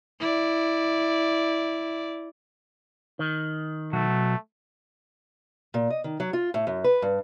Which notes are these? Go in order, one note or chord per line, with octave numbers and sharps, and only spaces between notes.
E4 D5
D#3
B2 F#3 A3 F#4
A#2
D#5
D#3
F#3
F4
A2
F#2
B4
G2